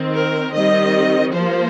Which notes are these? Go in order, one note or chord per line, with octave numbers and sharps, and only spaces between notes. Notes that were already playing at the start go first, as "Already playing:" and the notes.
Already playing: D#3 C4
A#4
D#3 G3 C4 D#5
F3 A#3 C5